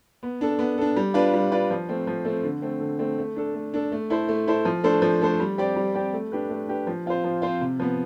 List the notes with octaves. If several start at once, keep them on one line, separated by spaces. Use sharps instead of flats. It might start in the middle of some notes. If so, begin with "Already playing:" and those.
B3
D4 A4
B3
D4 A4
G3
D4 F4 B4 D5
G3
D4 F4 B4 D5
F3
A3 C4
F3
A3 C4
D3
A3 C4
D3
A3 C4
A3
D4 A4
A3
D4 A4
A3
E4 A4 C5
A3
E4 A4 C5
F3
A3 D4 A4 C5
F3
A3 D4 A4 C5
G3
C4 G4 D5
G3
C4 G4 D5
A3
D4 G4 B4
A3
D4 G4 B4
F3
C4 F4 C5
F3
C4 F4 C5
C3
F3 B3